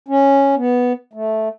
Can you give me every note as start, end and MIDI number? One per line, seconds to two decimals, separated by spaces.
0.08 0.55 61
0.56 0.93 59
1.13 1.49 57